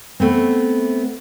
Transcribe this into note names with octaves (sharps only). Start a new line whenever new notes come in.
A3 B3 C4